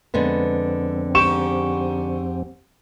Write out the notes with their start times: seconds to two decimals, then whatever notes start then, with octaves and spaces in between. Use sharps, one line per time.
0.14 F2 D3 G#3 B3 C4
1.15 G#2 G4 C#6 E7